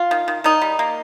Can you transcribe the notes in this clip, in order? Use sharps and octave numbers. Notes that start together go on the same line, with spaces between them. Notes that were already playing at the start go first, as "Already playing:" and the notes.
Already playing: F4
D#3
D#3
D#3 D#4
G3
A#3